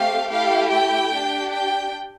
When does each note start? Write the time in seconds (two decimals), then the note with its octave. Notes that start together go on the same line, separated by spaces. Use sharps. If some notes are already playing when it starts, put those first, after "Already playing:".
Already playing: A3 C4 G4 F5
0.31 A3 E4 G4 F5
0.71 G5
1.10 D4 G4
1.51 G5